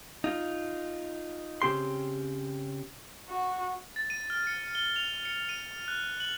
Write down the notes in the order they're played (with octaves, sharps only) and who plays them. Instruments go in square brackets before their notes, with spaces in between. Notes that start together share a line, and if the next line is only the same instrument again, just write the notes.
[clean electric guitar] D#4 F4
C#3 C4 G4 C6
[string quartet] F#4
[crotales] A6
D#7
F6
C#7
G7
F7
C#7
D#7
F#6
F#7